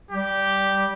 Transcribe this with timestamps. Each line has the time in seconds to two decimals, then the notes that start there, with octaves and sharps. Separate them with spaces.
0.11 G3 G4